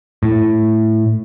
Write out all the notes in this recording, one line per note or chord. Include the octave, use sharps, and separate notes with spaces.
A2